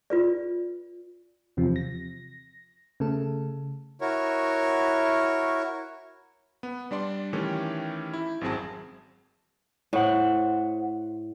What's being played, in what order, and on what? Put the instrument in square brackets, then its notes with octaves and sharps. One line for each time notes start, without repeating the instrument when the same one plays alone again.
[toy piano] F4 B4 D5
[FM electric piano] E2 C3 F3
A#6
C#3 A3 A4
[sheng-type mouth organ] E4 F#4 A#4 C#5
[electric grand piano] B3
G3 D4 D5 C6
D#3 E3 A3 C#4 G4
E4
G#1 F#2 F#3 C4 G#4 A5
[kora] A2 [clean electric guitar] C5 F#5